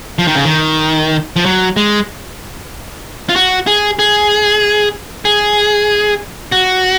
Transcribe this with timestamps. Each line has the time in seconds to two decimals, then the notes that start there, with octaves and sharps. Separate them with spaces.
0.19 F3
0.28 D#3
0.35 C#3
0.45 D#3
1.36 F3
1.46 F#3
1.77 G#3
3.29 F4
3.36 F#4
3.67 G#4
3.99 G#4
5.25 G#4
6.52 F#4